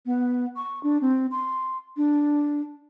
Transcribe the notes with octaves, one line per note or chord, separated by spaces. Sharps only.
B3
C#6
D4
C4
C6
D4